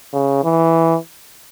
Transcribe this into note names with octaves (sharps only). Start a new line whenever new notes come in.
C#3
E3